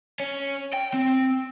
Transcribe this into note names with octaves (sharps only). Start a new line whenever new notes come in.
C#4
G5
C4